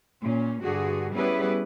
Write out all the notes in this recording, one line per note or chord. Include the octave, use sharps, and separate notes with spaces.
A#2 C#4
G2 D3 F#4 G#4
G3 B3 C#4 E4 G#4 B4